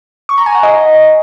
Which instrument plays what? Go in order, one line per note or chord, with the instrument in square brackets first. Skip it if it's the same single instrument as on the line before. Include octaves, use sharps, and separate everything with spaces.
[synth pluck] C#6
A#5
G#5
F#5
D#5